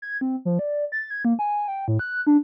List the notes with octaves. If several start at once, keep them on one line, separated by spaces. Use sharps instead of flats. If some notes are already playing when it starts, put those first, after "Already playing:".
G#6
C4
F3
D5
A6
G#6
A#3
G#5
G5
A2
F#6
D4